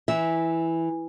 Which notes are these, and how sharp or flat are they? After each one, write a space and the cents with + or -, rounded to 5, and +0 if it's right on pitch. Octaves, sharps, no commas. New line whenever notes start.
E3 +0 E5 -15